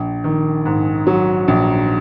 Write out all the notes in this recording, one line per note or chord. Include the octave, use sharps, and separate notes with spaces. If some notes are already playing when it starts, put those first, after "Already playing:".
Already playing: A#1
D#3
G#2
F#3
A#1